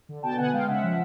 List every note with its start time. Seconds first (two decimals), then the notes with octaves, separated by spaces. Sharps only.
0.09 D3
0.23 B2 G5 A5
0.38 B3 F#5 G#5
0.53 G#3 F5 G5
0.68 C#3 E5 F#5
0.83 F3